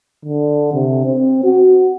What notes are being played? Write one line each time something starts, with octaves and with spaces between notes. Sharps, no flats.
D3
C3
C4
F#4